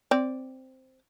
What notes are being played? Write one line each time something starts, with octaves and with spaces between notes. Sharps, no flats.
C4 D5